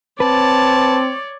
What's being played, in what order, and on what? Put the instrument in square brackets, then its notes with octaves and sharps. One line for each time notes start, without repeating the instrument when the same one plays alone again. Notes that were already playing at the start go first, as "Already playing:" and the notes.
[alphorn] C4 [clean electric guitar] B4 [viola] C#5 D5 [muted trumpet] A5